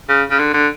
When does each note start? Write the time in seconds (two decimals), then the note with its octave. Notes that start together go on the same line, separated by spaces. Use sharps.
0.09 C#3
0.31 C#3
0.39 D3
0.54 D3